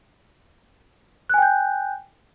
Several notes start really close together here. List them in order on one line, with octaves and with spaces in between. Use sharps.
F#6 G#5 G5 G6